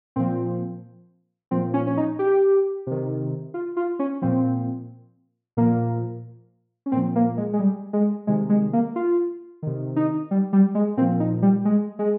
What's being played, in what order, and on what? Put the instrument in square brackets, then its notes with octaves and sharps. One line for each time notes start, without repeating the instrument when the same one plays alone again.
[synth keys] A#2 F3 C4
A#2 F3 C4
C#4
C#4
D#4
G4
C3 D#3
F4
F4
C#4
A#2 F3 C4
A#2 F3 A#3
C#4
A#2 F3 C4
A#3
G#3
G#3
G3
G#3
C3 D#3 G#3
G#3
A#3
F4
C3 D#3
D#4
G3
G3
G#3
A#2 C4
F3
D#4
G3
G#3
G#3